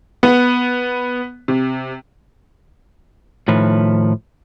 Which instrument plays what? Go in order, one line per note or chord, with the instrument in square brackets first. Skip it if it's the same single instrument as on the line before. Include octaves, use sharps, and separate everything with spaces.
[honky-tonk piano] B3
C3
[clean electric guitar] A2 D#3 F3 B4